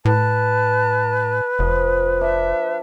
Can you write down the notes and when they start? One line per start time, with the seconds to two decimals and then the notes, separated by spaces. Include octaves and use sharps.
0.05 A2 B4 A5
1.59 F1 F3 D#5
2.21 D4 E5